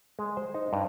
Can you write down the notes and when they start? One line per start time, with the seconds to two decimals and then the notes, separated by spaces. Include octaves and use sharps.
0.19 G#3
0.37 C5
0.54 D#4
0.73 G2